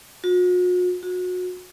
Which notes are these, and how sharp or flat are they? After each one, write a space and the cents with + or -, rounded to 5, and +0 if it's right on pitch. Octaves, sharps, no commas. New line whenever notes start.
F#4 -45
F#4 -30